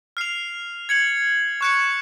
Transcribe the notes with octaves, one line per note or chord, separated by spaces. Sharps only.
F6 C7 F7
G#6 C#7 F#7
C#6 F#6 C#7